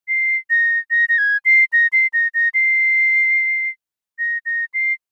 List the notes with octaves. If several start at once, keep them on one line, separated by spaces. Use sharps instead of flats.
C7
A#6
A#6
A#6
G#6
C7
A#6
C7
A#6
A#6
C7
A#6
A#6
C7